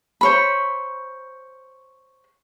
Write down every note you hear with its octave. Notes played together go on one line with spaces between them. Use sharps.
C5 C#5 B5